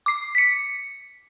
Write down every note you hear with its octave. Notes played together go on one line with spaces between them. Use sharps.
D6 C7
B6 C#7